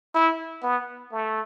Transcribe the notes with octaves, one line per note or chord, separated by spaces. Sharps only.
E4
B3
A3